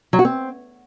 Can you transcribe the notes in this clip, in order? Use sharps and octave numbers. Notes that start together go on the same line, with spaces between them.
F#3
F#4
C4